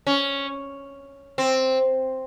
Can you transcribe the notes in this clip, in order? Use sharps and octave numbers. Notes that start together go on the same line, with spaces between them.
C#4
C4